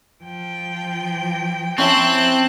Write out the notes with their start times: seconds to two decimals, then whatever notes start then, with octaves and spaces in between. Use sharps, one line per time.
0.23 F3 G5
1.78 C4 C#4 E4 E5 A5 F#6